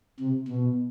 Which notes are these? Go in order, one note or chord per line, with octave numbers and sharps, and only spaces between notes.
C3
B2